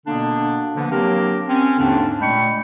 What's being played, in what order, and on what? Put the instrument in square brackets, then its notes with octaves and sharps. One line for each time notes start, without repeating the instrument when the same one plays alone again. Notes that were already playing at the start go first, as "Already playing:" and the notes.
[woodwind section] B2 D3 A#3 B3 D4
D3 E3 F3 A#3 B3
F#3 A#3 C4 D4 G4 A#4
C4 C#4
D#2 G#2 D3 C4 D4
A#2 G#3 A3 G5 B5 C#6